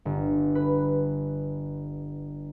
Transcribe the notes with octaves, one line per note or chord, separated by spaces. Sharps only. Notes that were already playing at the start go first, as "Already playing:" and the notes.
G1
B4